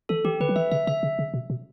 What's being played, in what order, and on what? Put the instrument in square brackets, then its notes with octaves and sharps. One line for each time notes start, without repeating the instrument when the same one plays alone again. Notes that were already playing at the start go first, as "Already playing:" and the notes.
[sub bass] E3 [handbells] A4
[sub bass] E3 [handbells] G4
[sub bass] D3 [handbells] B4
[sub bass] F#3
[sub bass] E3 [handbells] E5
[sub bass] C#3 [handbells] E5
[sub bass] C#3 [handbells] E5
[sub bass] C#3
C#3
B2
B2